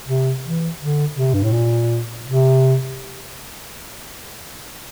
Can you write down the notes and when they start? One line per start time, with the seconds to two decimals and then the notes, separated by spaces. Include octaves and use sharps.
0.08 C3
0.44 E3
0.80 D3
1.16 C3
1.34 G2
1.43 A2
1.52 A#2
2.25 C3